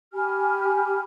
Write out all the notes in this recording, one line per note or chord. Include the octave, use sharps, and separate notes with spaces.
G4 G#5 B5 F6